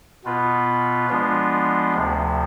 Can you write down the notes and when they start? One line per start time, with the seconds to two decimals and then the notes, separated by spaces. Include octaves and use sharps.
0.24 B2 B3 F4 B4
1.09 F3 G#3 B3 D4 F4
1.94 D2 C3 F3